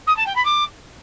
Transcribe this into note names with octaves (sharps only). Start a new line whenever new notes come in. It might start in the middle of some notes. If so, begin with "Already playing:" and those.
D#6
A5
G5
B5
D6